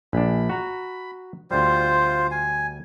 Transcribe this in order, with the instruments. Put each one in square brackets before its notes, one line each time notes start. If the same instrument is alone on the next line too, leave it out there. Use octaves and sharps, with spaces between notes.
[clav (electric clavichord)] A#1 D4 [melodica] B5
[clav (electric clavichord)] F#4 A#5
[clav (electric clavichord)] D2 G3 [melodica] F4 C5
[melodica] G#5